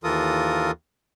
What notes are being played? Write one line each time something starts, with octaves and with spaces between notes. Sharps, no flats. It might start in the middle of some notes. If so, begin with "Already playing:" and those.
D#2 E3 F4 A4 A#4 D#6